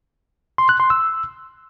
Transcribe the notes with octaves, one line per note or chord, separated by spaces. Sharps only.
C6
F#6
C6
E6